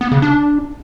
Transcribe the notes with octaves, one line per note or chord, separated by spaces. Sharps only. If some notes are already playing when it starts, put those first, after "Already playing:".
B3
C#3
D4